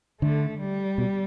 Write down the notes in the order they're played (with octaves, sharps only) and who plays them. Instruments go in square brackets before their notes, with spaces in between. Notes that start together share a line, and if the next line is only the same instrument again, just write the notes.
[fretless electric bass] D3 [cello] A3
[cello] G3
[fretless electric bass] B2